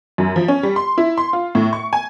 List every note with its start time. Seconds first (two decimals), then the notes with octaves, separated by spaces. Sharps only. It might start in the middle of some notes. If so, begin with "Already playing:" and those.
0.18 F#2
0.36 F3
0.48 C#4
0.63 G3
0.76 C6
0.98 E4
1.18 C6
1.33 F4
1.55 A2
1.73 C#6
1.93 G#5